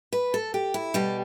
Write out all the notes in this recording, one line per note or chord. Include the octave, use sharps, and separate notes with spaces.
B4
A4
G4
E4
B2 G3 G4